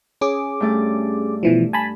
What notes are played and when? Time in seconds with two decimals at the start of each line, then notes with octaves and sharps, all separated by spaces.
0.21 C#4 G#4 D6
0.60 G2 A3 D5
1.43 B2 E3 F3
1.73 G#5 A5 B5